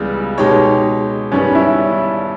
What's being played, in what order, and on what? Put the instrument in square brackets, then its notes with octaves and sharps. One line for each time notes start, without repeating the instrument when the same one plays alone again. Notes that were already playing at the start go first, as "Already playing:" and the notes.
Already playing: [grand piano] C#2 C#3 E3 G3 [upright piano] B3
[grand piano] B2 G#3 D#4 G4 C#5
[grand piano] G2 D#3 G3 B3 [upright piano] C#4
[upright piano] E4